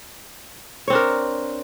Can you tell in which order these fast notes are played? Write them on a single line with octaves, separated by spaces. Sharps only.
C#5 C4 D4 A#4